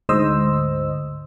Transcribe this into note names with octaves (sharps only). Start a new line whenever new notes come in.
D2 G#2 C5 D#5 E6